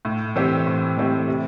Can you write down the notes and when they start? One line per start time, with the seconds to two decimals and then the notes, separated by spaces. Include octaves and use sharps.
0.05 A2
0.36 E3 A3 C4 G4
0.67 A2
0.97 E3 A3 C4 G4
1.28 C3